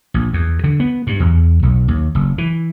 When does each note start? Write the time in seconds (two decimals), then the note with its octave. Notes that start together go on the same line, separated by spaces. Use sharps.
0.14 A#1
0.33 E2
0.64 D3
0.80 B3
1.07 G2
1.20 E2
1.63 B1
1.88 D#2
2.15 F#1
2.38 E3